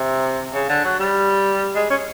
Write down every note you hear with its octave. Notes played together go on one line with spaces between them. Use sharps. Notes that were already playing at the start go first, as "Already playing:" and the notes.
Already playing: C3
C#3
D3
F#3
G3
G#3
C#4